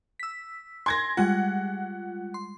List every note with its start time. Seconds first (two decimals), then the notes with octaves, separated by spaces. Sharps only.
0.20 E6 B6
0.86 G#5 C6 G#6 A#6
1.17 G3 G#3 F4 F#5
2.34 C6